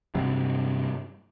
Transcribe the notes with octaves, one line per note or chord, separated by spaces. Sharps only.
G2 C3 F#3